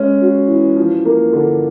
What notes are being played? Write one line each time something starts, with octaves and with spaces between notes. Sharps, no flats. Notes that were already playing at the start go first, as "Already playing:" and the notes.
Already playing: G#3 C#4
F#4
E3
F3
A#3
D3